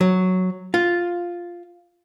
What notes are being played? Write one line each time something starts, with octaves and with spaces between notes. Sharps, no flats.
F#3
F4